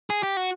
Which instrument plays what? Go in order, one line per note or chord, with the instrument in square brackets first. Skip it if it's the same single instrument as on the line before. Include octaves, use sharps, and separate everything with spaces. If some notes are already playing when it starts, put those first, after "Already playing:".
[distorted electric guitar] G#4
G4
F#4